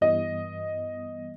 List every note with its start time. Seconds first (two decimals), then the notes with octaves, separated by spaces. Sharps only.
0.01 G2 E3 G3 B3 D#5